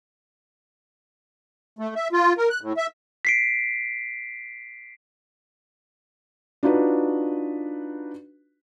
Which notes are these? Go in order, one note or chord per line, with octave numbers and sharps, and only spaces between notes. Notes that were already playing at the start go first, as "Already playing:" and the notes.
A3
E5
F4
A#4
F#6
A2
E5
B6 C7 D7
D4 D#4 F4 F#4 B4